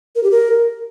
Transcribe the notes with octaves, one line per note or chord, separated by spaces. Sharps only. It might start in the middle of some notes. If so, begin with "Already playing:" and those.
A#4
G4
A#4